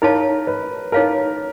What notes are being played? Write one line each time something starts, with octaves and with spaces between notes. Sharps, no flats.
D#4 G#4 A#4 C#5 F5 A5
B4
D#4 G#4 A#4 C#5 F5 A5